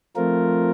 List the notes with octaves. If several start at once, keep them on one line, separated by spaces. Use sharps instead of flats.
F3 A3 C4 F4 A#4